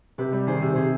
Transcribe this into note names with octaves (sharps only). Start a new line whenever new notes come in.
C3 G4 B4
G3
D#3 G#4 C5
C3
C3 G#4 C5